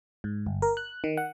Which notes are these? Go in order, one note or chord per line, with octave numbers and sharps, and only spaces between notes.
G#2
G1
A#4
F#6
D#3
F#5